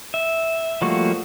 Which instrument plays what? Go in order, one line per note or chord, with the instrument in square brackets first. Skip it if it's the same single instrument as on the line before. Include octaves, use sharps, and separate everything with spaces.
[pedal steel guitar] E5
F3 G3 A3 A#3 F#4